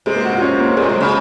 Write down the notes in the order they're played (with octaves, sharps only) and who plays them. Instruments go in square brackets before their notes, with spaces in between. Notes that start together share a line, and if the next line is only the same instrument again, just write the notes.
[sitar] C3 [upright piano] G#3
[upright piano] A#3
F#4
F4
C#4
A#3
[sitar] A#2 [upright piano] G#3
[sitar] C3
[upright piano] F#3
[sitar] C#3